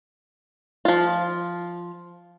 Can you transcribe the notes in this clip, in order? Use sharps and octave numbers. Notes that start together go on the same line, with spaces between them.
F3 F4